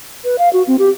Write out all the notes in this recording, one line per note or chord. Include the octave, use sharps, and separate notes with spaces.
B4
F5
F#4
C4
G4